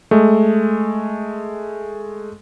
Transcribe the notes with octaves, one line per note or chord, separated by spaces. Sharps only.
G#3 A3